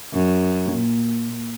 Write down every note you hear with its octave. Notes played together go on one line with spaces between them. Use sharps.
F#2
A#2